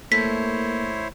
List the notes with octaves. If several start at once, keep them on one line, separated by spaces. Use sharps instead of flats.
A3 A#3 E4 C5 C#5 B6